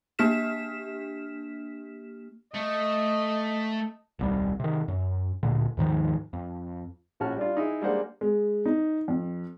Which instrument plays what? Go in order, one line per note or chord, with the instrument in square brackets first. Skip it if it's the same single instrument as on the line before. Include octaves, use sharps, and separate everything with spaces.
[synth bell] A#3 D4 G4 F6 B6 E7
[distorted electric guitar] A3 [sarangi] D#5
[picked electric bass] D#1 C2 G3
C3 D#3
F#2
D1 A#2 D3
D#2 G#2 D#3 F3
F2
[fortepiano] A#1 C#4 F#4 A5 F6
G3 D4 F4
D#4 E4 G#4
G3 G#3 A#3 D4 C5 F#5
[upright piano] G#3
D#4
F2